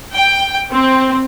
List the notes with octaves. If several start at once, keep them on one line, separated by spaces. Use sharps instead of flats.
G5
C4